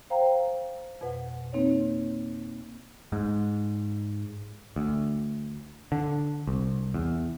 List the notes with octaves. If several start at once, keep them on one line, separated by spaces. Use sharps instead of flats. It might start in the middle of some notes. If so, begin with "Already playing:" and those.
C5 F5 G5 A#5
F2 B2 B4 F#5
A#3 C4 D#4 B4 C#5
G#2
D2
D3
C2
E2